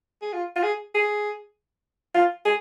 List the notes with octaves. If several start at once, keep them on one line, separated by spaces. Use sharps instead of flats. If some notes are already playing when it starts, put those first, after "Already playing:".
G#4
F4
F4
G#4
G#4
F4
G#4